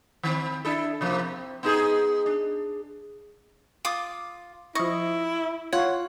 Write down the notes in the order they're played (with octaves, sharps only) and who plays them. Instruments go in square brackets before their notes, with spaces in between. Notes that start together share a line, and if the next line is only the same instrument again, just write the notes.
[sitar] D#3 C4
D4 E4 A4
C3 F3 A#3
C4
B3 D#4 G#4
D4
[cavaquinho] F4 D6 D#6
[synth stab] F3 D#5 [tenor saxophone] E4 [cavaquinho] C#6
[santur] F4 [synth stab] C#5 [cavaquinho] F#5